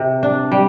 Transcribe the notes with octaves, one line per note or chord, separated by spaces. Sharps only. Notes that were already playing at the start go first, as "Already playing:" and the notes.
Already playing: C3
D4
G3